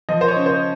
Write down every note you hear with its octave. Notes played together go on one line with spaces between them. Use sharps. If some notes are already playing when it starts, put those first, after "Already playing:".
F3 D#5
C5
C#5
C#3
C5